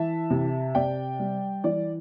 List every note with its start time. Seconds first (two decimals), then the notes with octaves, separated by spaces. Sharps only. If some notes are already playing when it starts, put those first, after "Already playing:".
Already playing: E3 E5 A5
0.30 C3
0.75 C3 D5 G5
1.19 G3
1.64 E3 D5